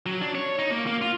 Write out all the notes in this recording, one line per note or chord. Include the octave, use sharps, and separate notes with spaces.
F#3
D4
C#5
D#4
A#3
A#3
F4